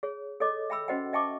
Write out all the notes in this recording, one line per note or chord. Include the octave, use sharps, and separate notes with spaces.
G#4 C#5
A4 C#5 D#5 D6
E5 G5 B5 E6
C#4 F#4 C5 D#5 F#5 G5
D#5 E5 G5 A5 C#6 D6